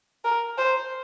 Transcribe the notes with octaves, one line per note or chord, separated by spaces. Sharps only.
A#4
C5